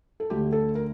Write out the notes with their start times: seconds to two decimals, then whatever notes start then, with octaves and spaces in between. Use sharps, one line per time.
0.20 A4
0.30 D2 D3 A3 G4
0.53 A4
0.75 A#4